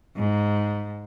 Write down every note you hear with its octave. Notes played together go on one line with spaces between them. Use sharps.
G#2